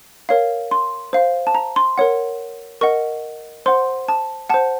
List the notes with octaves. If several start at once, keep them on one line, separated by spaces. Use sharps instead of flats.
A#4 C#5 F5
C6
C5 F5
A5
A#5
C6
A#4 C#5 F#5
A#4 D#5 F#5 C#6
C5 F#5 C6
A5
C5 F#5 A5